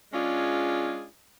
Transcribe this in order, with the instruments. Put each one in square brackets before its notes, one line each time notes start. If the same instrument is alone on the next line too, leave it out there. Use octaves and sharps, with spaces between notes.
[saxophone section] G#3 C#4 D4 F4 G#4